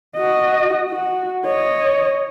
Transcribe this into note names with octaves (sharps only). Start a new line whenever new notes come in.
F#4 D#5
F#4
C#5 D#5